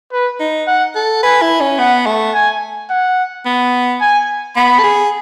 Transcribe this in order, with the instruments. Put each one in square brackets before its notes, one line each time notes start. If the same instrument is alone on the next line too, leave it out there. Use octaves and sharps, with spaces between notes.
[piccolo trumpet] B4
[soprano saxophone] D#4
[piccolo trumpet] F#5
[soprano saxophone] A4
[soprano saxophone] B4 [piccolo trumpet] G#5
[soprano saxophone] E4
C#4
[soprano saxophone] B3 [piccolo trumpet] F#5
[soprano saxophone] A3
[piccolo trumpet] G#5
F#5
[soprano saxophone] B3
[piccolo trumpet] G#5
[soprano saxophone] B3 [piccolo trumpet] B5
[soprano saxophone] A4
G#4